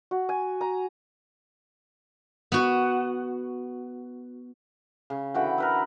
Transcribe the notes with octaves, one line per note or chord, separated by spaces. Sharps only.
F#4
G#5
A#5
B3 F#4
C#3
D3 E3 F#4 G5
A#4 B4 E5